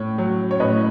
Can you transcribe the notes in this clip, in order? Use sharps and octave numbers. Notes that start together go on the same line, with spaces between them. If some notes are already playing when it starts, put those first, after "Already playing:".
Already playing: A2 C#5
F#3
C#5
A2 B4 D#5